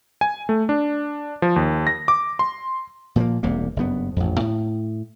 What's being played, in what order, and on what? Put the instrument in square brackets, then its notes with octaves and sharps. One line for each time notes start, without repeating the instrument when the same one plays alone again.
[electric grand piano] G#5
A3
D4
F3
D#2
A#6
D6
C6
[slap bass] A#2 F3 F#3 A#3
E1 C2 C3 A#3
F#1 G2 B3
A1 F2
A2